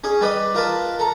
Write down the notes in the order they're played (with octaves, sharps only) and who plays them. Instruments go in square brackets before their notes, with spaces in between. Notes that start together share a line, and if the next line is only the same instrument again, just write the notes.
[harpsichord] C#4 G#4
G3 B4 D#5
F4 A#4 B4 A5
A4 A#5